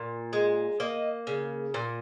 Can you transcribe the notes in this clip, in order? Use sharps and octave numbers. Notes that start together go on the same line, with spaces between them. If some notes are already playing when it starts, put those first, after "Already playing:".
Already playing: A#2
G#3
A#3 D#5
C#3
A#2